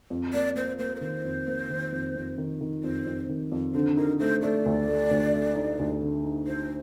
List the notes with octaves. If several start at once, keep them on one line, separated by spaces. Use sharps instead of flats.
F2
A#3 D5
A#3 C5
A#3 C5
A#4
D#3 C5
F2
A#3
D#3
F2
F2
D#3
D#3
F2 C5
F2
D#3
F2
D3 C5
D#4 A#4
A3 C5
A3 D5
D2
A3
D2
A3
D#4
D2
D3
D#4
D#4 C5